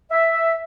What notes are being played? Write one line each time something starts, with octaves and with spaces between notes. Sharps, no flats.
E5